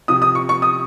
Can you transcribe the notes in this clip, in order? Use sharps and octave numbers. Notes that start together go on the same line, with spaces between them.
C3 F3 D#6
D#6
C#6
C#6
D#6